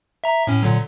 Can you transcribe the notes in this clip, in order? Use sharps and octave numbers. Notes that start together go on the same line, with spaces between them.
E5 A#5
A2 C#4
A#2 D3 F#3